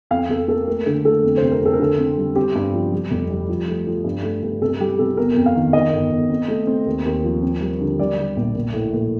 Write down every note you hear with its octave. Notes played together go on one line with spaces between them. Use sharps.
F2 F5
F2 A4
A#3 A4
A3 A#4
D3 A4
A3 A4
F2
C5
C3
A#4
F2 A4
A#4
D3 A4
C4
G3
C4 G4
G2
F3
G3
F1
G3
F3
A3
F3
G2
A3
G2
C3 A4
G3 G4
C3 A4
G1 A#4
F2
F5
D#3
D#3 D#5
G1
G1
C4
A3
C4
D#2
D#2
F3
C4
G3
D3
G3 D5
G3
A#1
A#1
A2
A#1